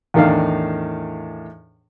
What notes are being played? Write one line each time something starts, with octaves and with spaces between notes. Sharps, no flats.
E2 A2 D#3 D4 F5